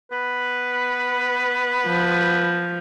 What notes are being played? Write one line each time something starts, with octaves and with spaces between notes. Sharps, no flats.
B3 B4
F3